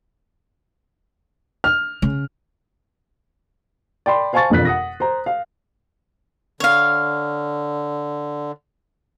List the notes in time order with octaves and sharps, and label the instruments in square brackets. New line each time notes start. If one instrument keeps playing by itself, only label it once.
[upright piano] F6
[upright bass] C#3
[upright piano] D5 G5 B5 C6
C5 F5 G#5 A5 C#6 A6
E1 F2 D4 F#6 B6
F#5 D#6 A#6
C5 A#5
F5
[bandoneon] D3 [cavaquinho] C#5 F5